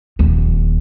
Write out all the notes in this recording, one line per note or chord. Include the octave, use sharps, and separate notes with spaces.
D#1 D#2